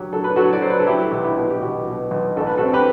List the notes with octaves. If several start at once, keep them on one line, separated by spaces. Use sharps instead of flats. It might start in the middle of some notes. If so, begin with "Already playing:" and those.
Already playing: F#3 G4
F#3 A4
B4
F#3 F#4 A4
D5
F#3 C5
B4
A4
F#3 E4 G4
B1
E4 G4
B2
G4
B1 F#4
B2
B1
A1 A4
B4
F#4 A4
C4
G4 B4